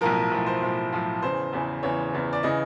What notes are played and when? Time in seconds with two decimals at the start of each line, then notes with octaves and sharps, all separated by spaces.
0.01 B1 A2 F3 A#4
0.32 B1 A2 F3
0.46 C5
0.62 B1 A2 F3
0.92 B1 A2 F3
1.22 E2 C#3 E3 C5
1.53 E2 C#3 E3
1.83 E2 C#3 E3 C#5
2.13 E2 C#3 E3
2.33 D5
2.43 C#3 E3 D#5